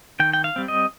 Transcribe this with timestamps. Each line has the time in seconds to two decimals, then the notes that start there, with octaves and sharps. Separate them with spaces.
0.20 D#3 G5
0.33 G5
0.44 F5
0.56 G3 C4
0.68 D#5